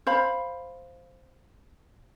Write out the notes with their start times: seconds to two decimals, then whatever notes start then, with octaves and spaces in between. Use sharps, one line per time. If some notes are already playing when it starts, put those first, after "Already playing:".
0.07 C5 F5 B5